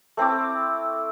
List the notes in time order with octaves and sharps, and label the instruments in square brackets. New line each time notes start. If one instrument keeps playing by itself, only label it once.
[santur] A3 C4 E4 D6